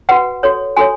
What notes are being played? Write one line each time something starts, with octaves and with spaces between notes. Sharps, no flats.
F#4 B4 F#5
F#4 A4 C#5
F#4 A4 C#5 G#5